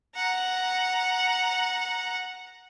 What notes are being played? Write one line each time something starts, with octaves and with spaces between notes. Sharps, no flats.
F#5 A#5